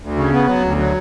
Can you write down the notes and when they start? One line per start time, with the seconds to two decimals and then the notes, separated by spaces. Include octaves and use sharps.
0.01 D2
0.16 C#3
0.32 B3
0.47 F#3
0.62 D2
0.77 F#3